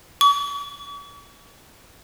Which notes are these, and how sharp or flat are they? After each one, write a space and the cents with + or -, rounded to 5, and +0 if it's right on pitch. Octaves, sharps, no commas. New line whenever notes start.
C#6 +45